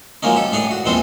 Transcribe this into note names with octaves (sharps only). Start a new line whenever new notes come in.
F3 F#3 G#3 A#3 C#4 D#4
G4 A4
A2 D4 G#4 C#5 D5
F#4
A#1 E2 G#3 C4 A4 C5